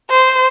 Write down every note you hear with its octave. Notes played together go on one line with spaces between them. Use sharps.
C5